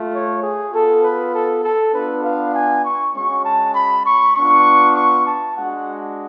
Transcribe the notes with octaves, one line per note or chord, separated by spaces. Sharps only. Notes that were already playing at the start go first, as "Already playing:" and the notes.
Already playing: A3 F4
C#5
G#4
B3 F4 A4
B4
A4
A4
B3 D4 F4 B4
F5
G#5
C#6
G#3 C#4 F#4 C#6
A5
B5
C#6
B3 D4 F4 C#6
C#6
A5
G#3 D4 F#4 F#5